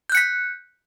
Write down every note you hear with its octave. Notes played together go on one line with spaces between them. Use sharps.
F#6 G6 B6 C#7